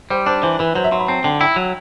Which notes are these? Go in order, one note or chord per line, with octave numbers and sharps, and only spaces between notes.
G3 C5
D4 C5
E3 C5
E3 B4
F#3 C5
E5
F#3 C6
B5
C4 A5
D3 G5
E4 G5
F#3